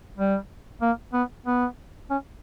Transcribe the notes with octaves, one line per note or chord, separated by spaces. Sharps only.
G3
A#3
B3
B3
C#4